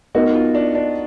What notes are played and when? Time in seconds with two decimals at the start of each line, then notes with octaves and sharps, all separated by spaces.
0.15 B3 D#4 F#4 A#4 D#5
0.35 F4
0.55 D4
0.75 D4